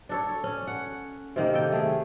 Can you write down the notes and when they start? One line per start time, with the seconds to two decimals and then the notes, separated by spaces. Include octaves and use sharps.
0.09 D4 A4 C#5
0.44 C#4
0.67 F#5
1.36 C3 D#3 A#3
1.54 A4 G5
1.72 A3 G#4